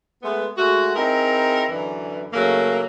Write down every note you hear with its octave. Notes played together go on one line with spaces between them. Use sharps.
G#3 A3 B3
G#3 A3 F#4
C4 D#4 E4 G#4 A#4
F#2 D3 E3
C#3 F#3 A3 A#3